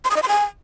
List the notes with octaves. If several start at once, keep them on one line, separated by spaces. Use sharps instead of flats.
C6
D#6
D#5
C6
G#5